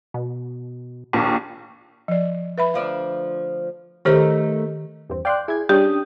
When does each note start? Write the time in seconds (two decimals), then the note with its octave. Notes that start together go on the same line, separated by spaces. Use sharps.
0.14 B2
1.13 A#1 D#2
2.08 F3 D5
2.58 B4 E5 B5
2.74 D2 F3 D4 F5
4.05 D#3 A3 D#4 G4 A#4 C5
5.10 E2 G2 C4
5.25 D5 F5 G5 C6 D6 F#6
5.48 E4 G#4 G#6
5.69 G3 C#4 D4 G4 G5 D#6